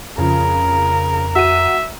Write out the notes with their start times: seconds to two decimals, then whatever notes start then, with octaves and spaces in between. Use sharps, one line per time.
0.18 F2 C#3 F3 A#4
1.36 F#4 E5 D#7